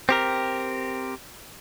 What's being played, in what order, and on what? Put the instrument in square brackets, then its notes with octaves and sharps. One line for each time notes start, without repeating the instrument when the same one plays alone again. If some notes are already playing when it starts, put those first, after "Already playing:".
[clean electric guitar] C4 G4 A#4